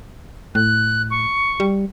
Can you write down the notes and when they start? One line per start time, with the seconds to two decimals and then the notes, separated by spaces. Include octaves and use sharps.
0.55 A2 F#6
1.11 C#6
1.60 G3